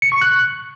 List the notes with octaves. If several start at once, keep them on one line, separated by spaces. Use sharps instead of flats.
C#7
C#6
F#6